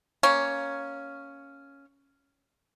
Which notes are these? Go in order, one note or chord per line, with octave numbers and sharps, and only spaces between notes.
A#3 C#4